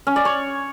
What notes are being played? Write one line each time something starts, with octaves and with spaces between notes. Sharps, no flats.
C#4
D5
C#5